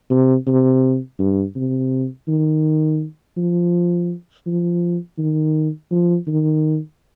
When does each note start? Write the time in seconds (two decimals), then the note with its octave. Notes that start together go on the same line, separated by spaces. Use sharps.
0.10 C3
0.47 C3
1.19 G2
1.56 C3
2.28 D#3
3.37 F3
4.46 F3
5.18 D#3
5.91 F3
6.27 D#3